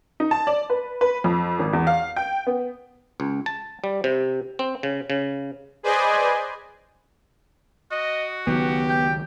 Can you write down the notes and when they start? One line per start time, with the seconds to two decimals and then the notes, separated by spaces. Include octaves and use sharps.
0.20 D#4
0.31 A5
0.47 D5
0.70 B4
1.01 B4
1.24 F2
1.59 G#1
1.73 E2
1.87 F5
2.16 G5
2.47 B3
3.20 C#2
3.46 A5
3.84 G3
4.04 C3
4.59 C4
4.83 C#3
5.10 C#3
5.83 G#4 B4 C5 D5 D#5 G#5
7.91 F#4 D#5
8.47 C#2 D#3 F#3 B3 G4
8.90 G5